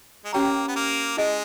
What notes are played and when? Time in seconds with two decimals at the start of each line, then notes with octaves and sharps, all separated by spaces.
0.25 G#3
0.33 A#3 C#4 G4 C#5 G5 A#5
0.68 B3
0.76 A#3
1.17 G#3 E4 G#4 D#5